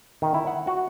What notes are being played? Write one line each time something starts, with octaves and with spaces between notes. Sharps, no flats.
D#3
E4
F#5
F#4